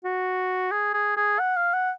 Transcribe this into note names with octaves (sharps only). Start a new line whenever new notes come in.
F#4
G#4
G#4
G#4
F#5
F5
F#5